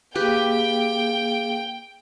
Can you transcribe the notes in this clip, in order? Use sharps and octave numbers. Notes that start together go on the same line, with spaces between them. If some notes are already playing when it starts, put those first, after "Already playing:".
A#3 G4 G#4 B4 F5 G5